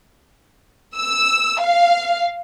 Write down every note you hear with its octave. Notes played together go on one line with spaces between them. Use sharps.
E6
F5